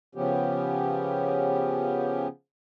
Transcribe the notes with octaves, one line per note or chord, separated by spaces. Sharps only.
C#3 F3 B3 C#4 G4